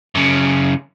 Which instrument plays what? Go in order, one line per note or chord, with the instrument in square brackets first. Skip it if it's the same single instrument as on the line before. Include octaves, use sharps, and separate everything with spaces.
[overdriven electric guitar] F#2 C#3